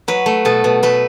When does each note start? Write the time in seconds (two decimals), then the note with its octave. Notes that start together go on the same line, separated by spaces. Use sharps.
0.08 F#3 B4
0.26 A3
0.45 B2 A4
0.64 B2
0.83 A3 B4